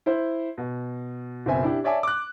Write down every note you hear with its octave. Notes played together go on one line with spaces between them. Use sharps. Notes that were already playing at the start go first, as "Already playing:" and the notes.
E4 C5
B2
F#1 B2 C4 E5 G#5
D4 E4 G4
C#5 D5 E5 G#5 A5 D6
D6 F#6